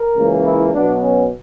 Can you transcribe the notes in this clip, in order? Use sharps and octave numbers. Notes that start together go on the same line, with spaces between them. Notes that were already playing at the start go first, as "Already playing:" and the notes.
Already playing: A#4
C#2 C#3 E3 A#3
E4
B2 F#3 B3 D4
C#4